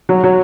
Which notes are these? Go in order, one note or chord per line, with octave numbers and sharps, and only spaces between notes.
F#3
F#3